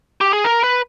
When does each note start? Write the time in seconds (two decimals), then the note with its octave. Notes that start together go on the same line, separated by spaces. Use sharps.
0.21 G4
0.33 G#4
0.44 A#4
0.64 B4